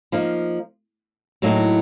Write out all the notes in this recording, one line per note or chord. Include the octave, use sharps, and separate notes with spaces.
F3 A#3 D#4
A2 F#3 A#3 D#4